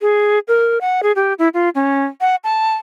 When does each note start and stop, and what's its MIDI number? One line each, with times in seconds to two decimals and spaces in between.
0.01 0.39 68
0.48 0.78 70
0.81 1.01 78
1.03 1.12 68
1.16 1.33 67
1.39 1.48 64
1.54 1.69 65
1.75 2.04 61
2.21 2.36 78
2.44 2.75 81